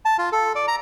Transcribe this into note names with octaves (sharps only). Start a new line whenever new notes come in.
A5
F4
A4
D5
A#5